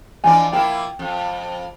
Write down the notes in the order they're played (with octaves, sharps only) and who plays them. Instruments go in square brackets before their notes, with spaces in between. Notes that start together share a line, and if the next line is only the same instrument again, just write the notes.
[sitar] E3 F3 D5 [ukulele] D4 D#5 G#5
[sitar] F3 A#3 E4 [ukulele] G5
[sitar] F2